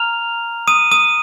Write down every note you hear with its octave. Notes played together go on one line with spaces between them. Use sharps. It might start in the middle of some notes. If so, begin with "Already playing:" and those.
Already playing: A#5 F6 F7
D#6 D#7
D#6 D#7